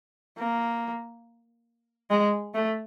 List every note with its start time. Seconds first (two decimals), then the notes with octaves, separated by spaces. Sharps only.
0.38 A#3
2.10 G#3
2.54 A3